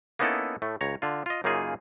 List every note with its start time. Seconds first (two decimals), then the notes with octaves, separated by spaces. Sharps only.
0.19 A#3 B3 C#4 D#4 E4 A4
0.62 A2 A3
0.81 C#2 C#5 A#5
1.02 D3 F4
1.26 F4 D#5
1.44 F#2 C#3 A#3 D#4 F4 G#4